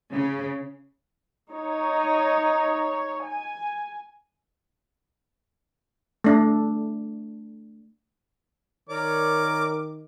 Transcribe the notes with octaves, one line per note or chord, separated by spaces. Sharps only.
C#3
D#4 C#5
G#5
A3 D4
D#3 A#4 C#5 D5 D6